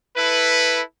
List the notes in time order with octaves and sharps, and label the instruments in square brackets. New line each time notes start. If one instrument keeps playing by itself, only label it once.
[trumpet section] E4 A4 B4